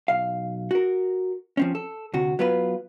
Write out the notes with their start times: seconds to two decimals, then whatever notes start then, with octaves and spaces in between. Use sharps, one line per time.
0.08 B1 F5
0.71 F#4 A#4
1.57 F3 C4 C#4
1.75 A4
2.14 D2 C3 F#4
2.39 F#3 B3 F4 B4